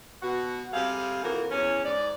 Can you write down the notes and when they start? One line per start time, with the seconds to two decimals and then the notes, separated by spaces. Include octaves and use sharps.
0.22 B2 F#4
0.73 C3 G3 G#4 A4 F5
1.23 F2 C3 E3 A#3 F#4 A#4
1.51 E2 C#4
1.85 G#2 D5